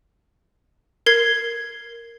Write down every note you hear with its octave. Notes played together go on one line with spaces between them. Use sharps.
A#4 G#6 C7